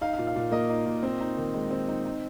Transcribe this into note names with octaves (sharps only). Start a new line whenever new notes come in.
D#4 F5
A#2 F5
F5
A#2
A#3 D#5
D#4
A#2
C4
D#4
D#3
G#3
C4
D#4
D#4